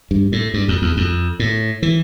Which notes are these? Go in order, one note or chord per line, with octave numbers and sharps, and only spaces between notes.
G2
A2
G2
F2
E2
F2
A2
E3